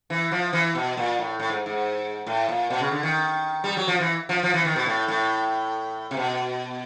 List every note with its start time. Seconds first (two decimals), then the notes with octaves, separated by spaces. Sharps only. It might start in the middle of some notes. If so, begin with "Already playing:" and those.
0.10 E3
0.31 F3
0.53 E3
0.75 B2
0.97 A#2
1.19 A2
1.39 A2
1.49 G#2
1.66 G#2
2.27 A2
2.49 A#2
2.70 B2
2.80 C#3
2.91 D3
3.03 D#3
3.64 G3
3.77 F#3
3.88 F3
4.00 E3
4.29 F3
4.43 F3
4.54 E3
4.65 D#3
4.76 B2
4.86 A2
5.08 A2
6.11 C3
6.17 B2